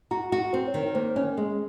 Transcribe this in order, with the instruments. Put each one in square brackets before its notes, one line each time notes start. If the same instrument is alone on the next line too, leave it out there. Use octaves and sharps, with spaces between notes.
[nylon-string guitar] F#4 [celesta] A#5
[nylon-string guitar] F#4
[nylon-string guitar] C4 [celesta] C5
[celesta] C#5
[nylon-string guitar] D#3
[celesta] C#5
[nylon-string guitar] A#3 [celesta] C5
[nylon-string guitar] C#4 [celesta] C#5
[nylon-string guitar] G#3